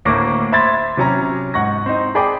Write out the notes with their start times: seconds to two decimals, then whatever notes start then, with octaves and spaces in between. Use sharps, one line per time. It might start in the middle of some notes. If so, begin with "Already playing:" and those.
0.05 D2 A2 A#3 C#6 D6 A#6
0.52 C5 E5 B5 C6 G#6 A6
0.97 C3 F#3 C#4 A#5
1.54 G#2 F#5 C#6 A#6
1.86 C4 D#4
2.15 G#4 D5 G5 B5 D6